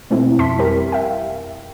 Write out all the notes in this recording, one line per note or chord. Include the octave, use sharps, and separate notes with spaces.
B2 G#3 A3 C4 E4
F2 E5 A5 C6 B6
G3 G4 A#4
E5 F5 G5